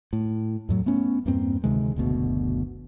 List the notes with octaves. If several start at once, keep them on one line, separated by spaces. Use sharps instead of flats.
A2
F2 A2 F#3
A3 B3 C#4
E2 G2 A#3 C4
D2 C3 D#3 G#3
F#1 D2 B2